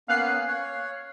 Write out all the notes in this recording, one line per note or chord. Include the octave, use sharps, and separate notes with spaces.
A#3 B3 C#4 F5 F#6 C7
C#5